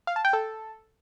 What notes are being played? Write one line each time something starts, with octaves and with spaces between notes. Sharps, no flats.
F5
A5
G5
A4